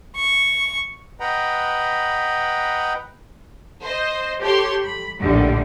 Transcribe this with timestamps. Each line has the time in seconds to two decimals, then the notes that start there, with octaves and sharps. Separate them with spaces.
0.16 C#6
1.20 B4 D#5 F#5 G5 A#5 B5
3.81 C5 D#5
4.41 G4 A4 C#5 C6
4.82 B5
5.20 A#1 D#2 A2 D3 G3 A3